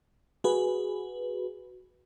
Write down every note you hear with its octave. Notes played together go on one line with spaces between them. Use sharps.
F#4 G#4 B4